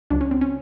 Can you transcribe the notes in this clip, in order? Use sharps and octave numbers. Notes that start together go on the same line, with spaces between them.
C#2 C#3 F#3 D4
C#4
C4
C#4